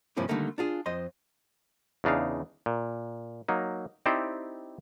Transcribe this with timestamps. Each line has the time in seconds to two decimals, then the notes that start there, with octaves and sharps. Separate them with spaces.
0.17 G2 C3 F3 A#3 C#4 E4
0.29 D3 D#3 G3 A3 A#3
0.58 D4 F4 G#4
0.86 F2 C5 D#5 C6
2.04 E2 C#3 D4 D#4 F5
2.66 A#2
3.48 F#3 A#3 D#4
4.06 C4 D#4 E4 G4 C5 D5